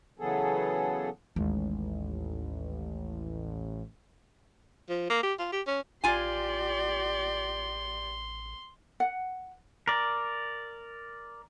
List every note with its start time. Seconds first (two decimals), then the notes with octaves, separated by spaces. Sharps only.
0.19 C#3 E3 F#3 B3 G#4 A4
1.36 A1 D#2 G#3
4.89 F3
5.10 A#3
5.23 G4
5.39 F4
5.52 G4
5.67 C#4
6.04 A1 F4 G4 D5 G#5 C6
9.00 F#5
9.88 A#4 D5